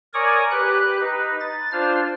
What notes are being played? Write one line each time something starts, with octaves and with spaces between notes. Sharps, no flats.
A#4 C#5 D5 G#5 C#6 D#6
G4 B4 F#6
D#4 B4
A6
D4 F4 C5 F6